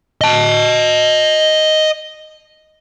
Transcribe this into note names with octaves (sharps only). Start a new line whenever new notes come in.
D#5 A5